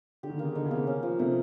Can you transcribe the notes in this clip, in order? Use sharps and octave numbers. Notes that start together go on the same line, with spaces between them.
D3 G4
D#3
D3
C#3 A#3
D3 D#4
C#3
C3 A#3
C#3
C#4
F3
C3 A3